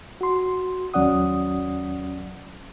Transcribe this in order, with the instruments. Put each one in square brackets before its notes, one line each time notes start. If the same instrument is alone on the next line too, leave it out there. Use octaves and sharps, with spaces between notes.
[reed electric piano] F#4 C6
D#2 F#3 C#4 D5 F#5 D#6